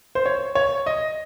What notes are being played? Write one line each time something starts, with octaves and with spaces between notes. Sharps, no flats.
C5
C#5
C#5
D#5